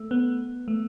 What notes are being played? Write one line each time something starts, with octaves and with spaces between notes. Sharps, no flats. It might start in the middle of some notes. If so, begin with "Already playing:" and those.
Already playing: A3
B3
A3